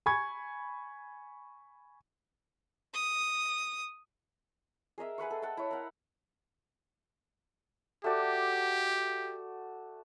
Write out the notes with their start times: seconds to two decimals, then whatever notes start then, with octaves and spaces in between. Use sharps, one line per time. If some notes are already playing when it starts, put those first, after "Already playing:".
0.06 G#5 B5 C#6 G#6
2.93 D#6
4.98 G#4 A#4 D#5 E5
5.18 G#4 B4 F#5 C#6
5.30 A4
5.42 A4 F#5 G5 A5
5.57 E4 C#5
5.71 A#4 F#5
8.04 A3 F#4 G4 D5